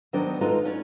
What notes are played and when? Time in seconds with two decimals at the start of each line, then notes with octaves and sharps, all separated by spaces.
0.13 D#3 F#3 B3 D4 C5 D5
0.41 G#3 D#4 F4 F#4 A4 B4
0.65 C#4 C#5 D5